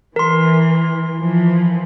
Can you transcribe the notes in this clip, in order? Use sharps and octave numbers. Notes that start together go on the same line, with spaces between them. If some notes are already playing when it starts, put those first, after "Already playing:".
E3 A#4 C6
E3 F3